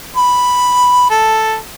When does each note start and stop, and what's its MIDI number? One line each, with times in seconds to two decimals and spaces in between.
0.17 1.05 83
1.11 1.56 69